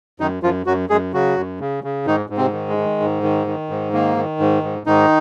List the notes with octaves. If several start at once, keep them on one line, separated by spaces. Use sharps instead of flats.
F#2 D#3 D#4
F#2 F3 F4
F#2 F#3 F#4
F#2 G#3 G#4
C#3 F#3 F#4
F#2
C#3
C#3
G#2 D#3 D#4
G#2
C3 C4
D#3
G#3
D#3
G#2
D#3
D#3
G#2
D#3 A#3
D#3
G#2
G#2
G#2 D#3 D#4